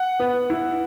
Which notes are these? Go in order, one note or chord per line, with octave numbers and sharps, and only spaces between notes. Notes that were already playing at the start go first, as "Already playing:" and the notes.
Already playing: F#5
B3
E4